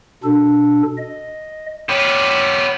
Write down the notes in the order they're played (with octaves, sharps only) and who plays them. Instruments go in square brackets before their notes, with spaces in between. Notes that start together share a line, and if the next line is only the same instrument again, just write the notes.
[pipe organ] B2 D4 A4
D#5
[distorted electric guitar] B3 G4 [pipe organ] C#5